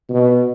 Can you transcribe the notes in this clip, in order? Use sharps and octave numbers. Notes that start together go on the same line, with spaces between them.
B2